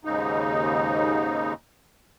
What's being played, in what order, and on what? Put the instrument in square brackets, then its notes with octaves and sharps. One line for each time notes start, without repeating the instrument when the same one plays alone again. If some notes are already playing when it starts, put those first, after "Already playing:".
[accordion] D#2 G#2 C#3 D#4